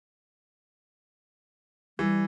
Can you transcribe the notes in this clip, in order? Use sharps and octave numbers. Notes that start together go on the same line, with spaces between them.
E3 G3